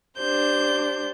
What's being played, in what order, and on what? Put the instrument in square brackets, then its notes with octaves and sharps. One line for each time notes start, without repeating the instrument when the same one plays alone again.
[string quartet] D4 G4 C5 G6